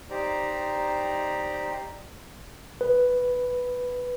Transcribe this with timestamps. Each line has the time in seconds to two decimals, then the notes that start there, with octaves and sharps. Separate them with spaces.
0.10 D#4 G4 C5 D5 A#5
2.81 B4